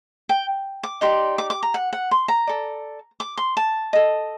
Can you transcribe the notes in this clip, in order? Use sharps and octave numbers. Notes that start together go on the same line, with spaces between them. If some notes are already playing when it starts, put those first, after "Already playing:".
G5
D6
D#4 G4 D5 C6
D6
D6
A#5
F#5
F#5
C6
A#5
A4 D5
D6
C6
A5
A4 D#5